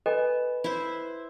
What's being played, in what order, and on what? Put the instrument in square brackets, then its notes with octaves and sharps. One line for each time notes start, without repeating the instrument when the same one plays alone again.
[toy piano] A4 D#5 G#5 [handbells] B4
[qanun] E4 C5